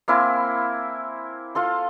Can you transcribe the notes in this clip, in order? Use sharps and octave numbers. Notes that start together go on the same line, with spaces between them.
A#3 C4 E4 G#5
F4 A4 C6